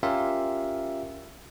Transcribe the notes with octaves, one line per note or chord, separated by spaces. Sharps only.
C#4 F4 G4 A#4 E5 F5